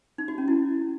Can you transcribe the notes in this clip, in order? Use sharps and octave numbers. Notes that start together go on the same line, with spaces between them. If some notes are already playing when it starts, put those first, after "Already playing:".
D#4
F#4
C#4
E4